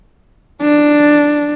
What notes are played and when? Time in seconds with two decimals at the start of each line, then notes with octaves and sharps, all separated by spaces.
0.62 D4